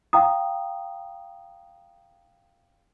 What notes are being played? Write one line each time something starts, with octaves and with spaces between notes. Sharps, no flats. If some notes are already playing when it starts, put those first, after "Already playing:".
F5 G5 A#5 D#6